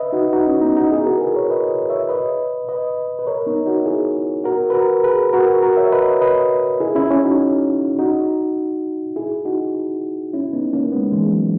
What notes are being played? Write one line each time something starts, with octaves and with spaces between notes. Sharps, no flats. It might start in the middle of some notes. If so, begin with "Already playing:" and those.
Already playing: B4 D#5 E5
D#4 F#4
D#4 F#4
C#4 E4
B3 D#4
D#4 F#4
E4 G#4
F#4 A#4
G#4 B4
A#4 C#5
B4 D#5
C#5 E5
B4 D#5
B4 D#5
B4
A#4 C#5
B3 D#4
D#4 F#4
E4 G#4
F#4 A#4
B4
F#4 A#4
G#4 B4
F#4 A#4
F#4 A#4
C#5 E5
B4 D#5
B4 D#5
E4 G#4
C#4 E4
C#4 E4
D#4 F#4
D#4 F#4
E4 G#4
D#4 F#4
C#4 E4
B3 D#4
A#3 C#4
G#3 B3
E3 G#3
F#3